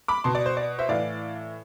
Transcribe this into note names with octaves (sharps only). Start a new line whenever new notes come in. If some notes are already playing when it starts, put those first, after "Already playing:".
B5 D6
B2 A5 C6
D5
C5
D5
C5 E5
A2 E3 D5 F5